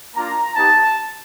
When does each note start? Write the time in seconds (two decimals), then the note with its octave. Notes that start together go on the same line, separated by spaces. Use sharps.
0.15 A#3 D4 F4 A#5
0.56 B3 D#4 G4 A5